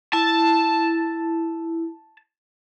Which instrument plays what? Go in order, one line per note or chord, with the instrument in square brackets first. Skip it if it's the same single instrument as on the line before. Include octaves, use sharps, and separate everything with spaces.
[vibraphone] E4 [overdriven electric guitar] A5